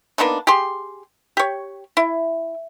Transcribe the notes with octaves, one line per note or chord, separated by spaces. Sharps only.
A#3 B3 D4 D#4
G4 G#4 C6
G4 C#5
E4